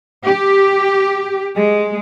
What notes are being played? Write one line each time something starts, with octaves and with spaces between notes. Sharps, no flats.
G4
G#3